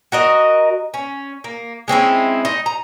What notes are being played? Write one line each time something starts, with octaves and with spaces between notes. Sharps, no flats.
F#4 A#4 D#5
C#4
A#3
G#3 C4 C#4 E4
D#4
A#5